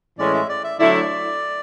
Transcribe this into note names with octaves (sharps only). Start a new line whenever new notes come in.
A2 E3 G#3 C#4 D5
E5
D5
E5
D3 F#3 A3 E4 D5